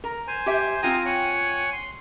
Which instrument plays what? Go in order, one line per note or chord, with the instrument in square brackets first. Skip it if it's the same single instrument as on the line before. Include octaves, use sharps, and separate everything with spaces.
[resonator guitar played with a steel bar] A#4
[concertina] C5 G#5
[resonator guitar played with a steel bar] G4 E5
[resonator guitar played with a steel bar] C4 F4 G5 [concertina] G#5 A#5 D#6
[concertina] C#5 F#5 G#5
C6